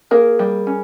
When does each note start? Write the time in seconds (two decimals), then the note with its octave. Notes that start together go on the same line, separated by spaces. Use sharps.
0.11 A#3 G#4 A#4
0.39 G3
0.67 C#4